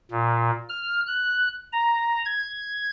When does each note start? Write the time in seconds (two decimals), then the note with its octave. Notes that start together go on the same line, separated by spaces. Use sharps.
0.11 A#2
0.69 F6
1.07 F#6
1.72 A#5
2.25 G#6